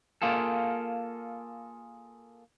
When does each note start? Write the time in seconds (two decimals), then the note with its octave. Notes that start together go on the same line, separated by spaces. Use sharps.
0.22 A#3 F4 G#4 A4